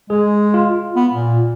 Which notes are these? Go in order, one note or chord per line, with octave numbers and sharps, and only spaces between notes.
G#3 G#4
F4
B3
A#2